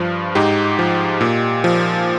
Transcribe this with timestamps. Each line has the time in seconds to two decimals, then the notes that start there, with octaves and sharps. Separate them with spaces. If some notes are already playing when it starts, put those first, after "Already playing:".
Already playing: G2 F3
0.35 G#2 D#4 G4
0.79 F3
1.21 A#2
1.64 F3